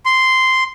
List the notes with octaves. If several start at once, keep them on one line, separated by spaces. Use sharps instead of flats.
C6